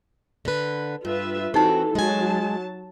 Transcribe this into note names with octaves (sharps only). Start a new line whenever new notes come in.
D3 B4
G2 F4 B4 E5
E3 C4 D#4 F#4 G4 A4
F#3 G#3 G#5 A5